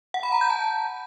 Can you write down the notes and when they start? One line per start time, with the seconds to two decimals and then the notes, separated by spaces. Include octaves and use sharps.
0.14 F#5
0.23 B5
0.32 A#5
0.41 G6
0.50 A5